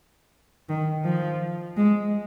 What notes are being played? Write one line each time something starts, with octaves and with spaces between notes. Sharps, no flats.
D#3
F3
G#3